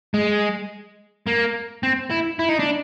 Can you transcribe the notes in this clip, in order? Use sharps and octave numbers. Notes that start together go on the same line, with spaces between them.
G#3
A#3
C4
E4
E4
D#4
D4